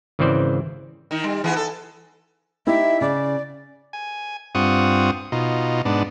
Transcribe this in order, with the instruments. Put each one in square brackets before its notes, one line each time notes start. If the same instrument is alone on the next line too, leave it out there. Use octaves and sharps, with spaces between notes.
[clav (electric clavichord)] G#1 C#3 E3 C4 C5 D5
[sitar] D#3 D#4
G3
E3 B3 G#4
A4
[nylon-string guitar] D#4 E4 G4 [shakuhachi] E5
[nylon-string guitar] C#3 [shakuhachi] D5
[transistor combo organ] G#5
G2 C4 F4 F#5 C#6 D#6
B2 D#4 F4
G#2 B3 D4